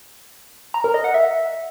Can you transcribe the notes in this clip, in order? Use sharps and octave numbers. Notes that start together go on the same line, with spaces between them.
A#5
A#4
D#5
F#5
E5